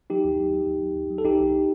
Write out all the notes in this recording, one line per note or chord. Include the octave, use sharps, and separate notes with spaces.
F#3 D#4 G4
D#2
D#2
F#3
D#2
D#2
D#2
F#3
A4
C2 D#4 G4
C2